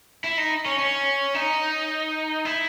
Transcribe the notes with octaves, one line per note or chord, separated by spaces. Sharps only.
E4
D#4
C#4
C#4
D#4
E4